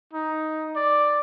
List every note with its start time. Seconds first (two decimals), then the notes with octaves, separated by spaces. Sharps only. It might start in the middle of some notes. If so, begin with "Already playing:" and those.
0.13 D#4
0.76 D5